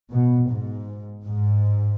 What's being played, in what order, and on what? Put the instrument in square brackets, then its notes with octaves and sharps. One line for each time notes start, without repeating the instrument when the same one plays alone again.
[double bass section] B2
G#2
G#2